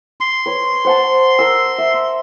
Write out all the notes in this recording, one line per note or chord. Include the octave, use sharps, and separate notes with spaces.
C6
B4 C#5
C5 F#5 A5
A#4 E6
E5